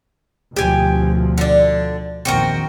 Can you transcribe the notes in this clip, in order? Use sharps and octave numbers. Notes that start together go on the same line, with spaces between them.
D2 B2 F3 G4 G#5
D3 D4
A#1 E2 D#3 C4 F#4 A#4